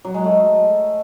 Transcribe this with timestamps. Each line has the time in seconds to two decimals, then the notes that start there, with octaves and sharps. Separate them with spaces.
0.05 F#3
0.14 G#3
0.24 A3